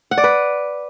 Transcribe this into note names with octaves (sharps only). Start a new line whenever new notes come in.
F#5
D5
B4